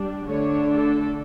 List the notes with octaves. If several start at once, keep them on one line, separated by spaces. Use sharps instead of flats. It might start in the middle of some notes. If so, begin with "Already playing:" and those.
Already playing: G3 D4
D3 A3 D4 C#5
A4